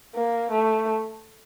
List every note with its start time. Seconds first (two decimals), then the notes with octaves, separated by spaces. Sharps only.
0.15 A#3
0.51 A3